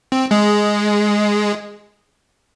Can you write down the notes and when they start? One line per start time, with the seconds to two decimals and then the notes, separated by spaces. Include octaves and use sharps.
0.12 C4
0.31 G#3 G#4